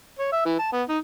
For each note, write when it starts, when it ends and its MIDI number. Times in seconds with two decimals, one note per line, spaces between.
0.19 0.30 73
0.32 0.44 76
0.45 0.59 52
0.59 0.72 81
0.72 0.83 59
0.89 0.98 63